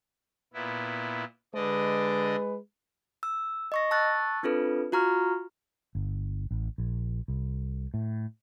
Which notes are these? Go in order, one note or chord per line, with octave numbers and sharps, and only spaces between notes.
A#2 B3 E4
D3 G#3 B4 D5 D#5
E6
D#5 C#6 A#6
A5 C#6 E6 F#6 A6
C4 D4 F4 A4 B4
F4 F#4 A#5 C#6 F6
G1
A1
A#1
C2
A2